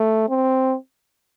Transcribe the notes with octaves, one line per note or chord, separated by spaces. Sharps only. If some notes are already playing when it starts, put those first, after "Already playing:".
Already playing: A3
C4